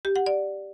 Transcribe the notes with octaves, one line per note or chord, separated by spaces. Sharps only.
G4
F#5
D5